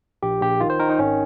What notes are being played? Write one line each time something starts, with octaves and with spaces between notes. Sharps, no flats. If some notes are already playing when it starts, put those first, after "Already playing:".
A#1 G4
A#1 G4
D#3 F4
C5
D#3 A#4
D#4
G#1 C#4